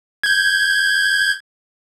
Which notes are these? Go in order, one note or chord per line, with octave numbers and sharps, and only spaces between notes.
G6 G#6